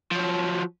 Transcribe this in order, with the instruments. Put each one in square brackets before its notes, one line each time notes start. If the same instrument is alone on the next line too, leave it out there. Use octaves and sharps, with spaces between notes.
[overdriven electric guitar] F3 F#3